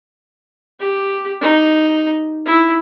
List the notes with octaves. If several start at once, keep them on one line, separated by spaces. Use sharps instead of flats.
G4
D#4
E4